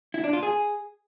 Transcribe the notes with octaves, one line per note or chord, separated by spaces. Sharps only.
E4
D4
F4
G#4